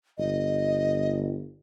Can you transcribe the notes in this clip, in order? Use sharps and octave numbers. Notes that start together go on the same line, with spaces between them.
G1 D#5